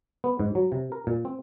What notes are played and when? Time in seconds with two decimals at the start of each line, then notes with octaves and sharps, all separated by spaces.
0.24 B3
0.39 G#2
0.55 F#3
0.72 C3
0.92 A#4
1.07 A#2
1.25 C4